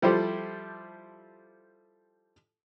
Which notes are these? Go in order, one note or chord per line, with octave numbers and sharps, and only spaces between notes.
F3 G3 E4 G4 A4 C5